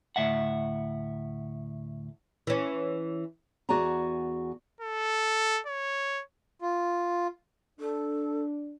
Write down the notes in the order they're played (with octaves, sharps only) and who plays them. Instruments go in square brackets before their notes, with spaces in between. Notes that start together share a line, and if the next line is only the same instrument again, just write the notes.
[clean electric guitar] D2 A2 E5 F#5
[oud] E3 C#4
[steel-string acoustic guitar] E2 F#4 G#4 D5 A5 A#5
[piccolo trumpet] A4
C#5
[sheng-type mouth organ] F4
[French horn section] D4 [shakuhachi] A4